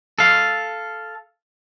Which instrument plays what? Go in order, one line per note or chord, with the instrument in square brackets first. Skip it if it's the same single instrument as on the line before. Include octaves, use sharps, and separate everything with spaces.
[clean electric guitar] A4 F5